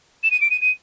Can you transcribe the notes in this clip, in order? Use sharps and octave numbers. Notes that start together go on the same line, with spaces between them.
E7
D#7
D7
D#7
D#7